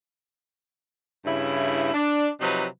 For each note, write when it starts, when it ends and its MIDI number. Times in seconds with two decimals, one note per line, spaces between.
1.25 1.92 43
1.25 1.92 49
1.25 1.92 64
1.93 2.29 62
2.41 2.66 48
2.41 2.66 53
2.41 2.66 54
2.41 2.66 63
2.41 2.66 71